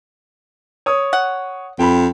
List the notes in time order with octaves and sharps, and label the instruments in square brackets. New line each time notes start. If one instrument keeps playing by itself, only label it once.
[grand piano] C#5 D#6
[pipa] F#5
[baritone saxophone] F2 [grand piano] G5 B5